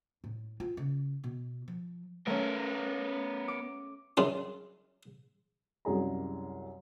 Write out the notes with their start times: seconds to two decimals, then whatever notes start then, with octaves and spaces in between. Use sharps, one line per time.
0.24 A2
0.60 F4
0.77 C#3
1.24 B2
1.68 F3
2.27 A3 B3 C#4 A#4
3.48 D6
4.17 F#2 C#3 F4
5.85 C2 F#2 G#4 A#5